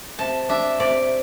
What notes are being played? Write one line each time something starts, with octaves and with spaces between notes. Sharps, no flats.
C3 A5
D4 E5
C3 D5